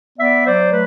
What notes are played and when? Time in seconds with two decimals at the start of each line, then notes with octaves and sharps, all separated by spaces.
0.18 B3 D5 E5
0.45 F#3 C5 D5
0.71 A3 B4